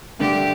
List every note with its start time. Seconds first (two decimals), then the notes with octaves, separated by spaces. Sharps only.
0.19 G2 D3 A3 D4 G4